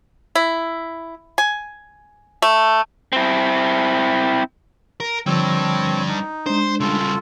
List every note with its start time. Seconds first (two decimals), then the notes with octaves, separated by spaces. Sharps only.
0.35 E4
1.38 G#5
2.42 A3
3.13 C4 E4
5.00 A#4
5.26 D3 F3 G3 C4 D4 C#5 E6
6.08 D#4
6.46 G#3 D4 C5
6.80 C#3 G3 F4 A4